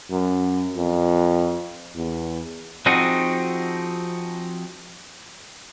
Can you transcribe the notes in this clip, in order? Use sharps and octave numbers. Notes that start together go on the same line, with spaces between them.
F#2
F2
E2
F3 C4 D#4 F#4 G#4